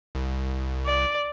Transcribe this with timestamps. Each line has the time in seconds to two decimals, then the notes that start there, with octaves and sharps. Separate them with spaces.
0.15 C2
0.85 D5